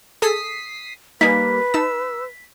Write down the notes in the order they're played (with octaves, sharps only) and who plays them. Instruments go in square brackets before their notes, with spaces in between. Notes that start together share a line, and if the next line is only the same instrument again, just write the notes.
[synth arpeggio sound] G#4 A4 [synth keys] D#6 B6 C7
[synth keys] G3 A#3 [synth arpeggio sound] D#4 G#5 [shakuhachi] B4 [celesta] B6
[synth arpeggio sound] D#4 A5 [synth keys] E6